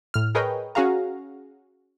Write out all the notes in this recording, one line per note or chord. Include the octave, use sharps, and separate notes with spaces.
A2 F6
G#4 A#4 B4 C#5 D#5 G5
C#4 F#4 G#4 F5 A#5